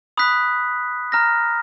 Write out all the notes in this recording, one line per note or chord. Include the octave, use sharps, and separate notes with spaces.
B5 D#6 F#6 B6
A#5 F6 A#6